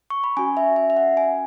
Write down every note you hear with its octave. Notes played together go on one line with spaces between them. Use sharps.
C#6
B5
C#4 F#4 G#5
E5
E5
E5
F#5
G#5